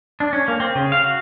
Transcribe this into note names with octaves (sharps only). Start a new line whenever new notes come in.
D4
C#4
A#3
C4
C#3
F5
F#4